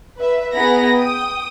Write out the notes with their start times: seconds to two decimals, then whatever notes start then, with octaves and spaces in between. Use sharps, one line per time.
0.17 B4 E5
0.54 B3 E4 G#4 A#5 B5 A#6
0.96 G5 D#6